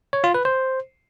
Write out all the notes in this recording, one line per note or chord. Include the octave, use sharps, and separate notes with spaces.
C#5
F4
B4
C5